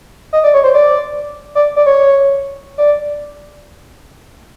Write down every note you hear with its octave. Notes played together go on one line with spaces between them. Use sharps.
D#5
D5
C#5
C5
D5
D5
D5
C#5
D5